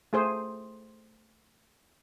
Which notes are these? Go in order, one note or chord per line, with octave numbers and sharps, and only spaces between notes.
A3 G#4 C5